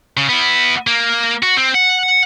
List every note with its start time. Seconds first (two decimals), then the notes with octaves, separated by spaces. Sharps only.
0.17 C#3
0.29 B3 E4
0.87 A#3
1.43 F#4
1.57 C4
1.75 F#5